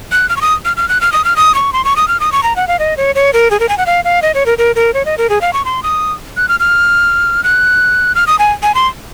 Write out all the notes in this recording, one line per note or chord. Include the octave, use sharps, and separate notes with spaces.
F#6
F6
C#6
D#6
F6
F6
F#6
F6
D#6
F6
D#6
C#6
C6
C#6
D#6
F6
D#6
C#6
A#5
F#5
F5
D#5
C#5
C#5
A#4
G#4
A#4
G#5
F#5
F5
F5
D#5
C#5
A#4
A#4
A#4
C#5
D#5
A#4
G#4
F5
C#6
C6
D#6
F#6
F6
F6
F#6
F6
D#6
G#5
G#5
C6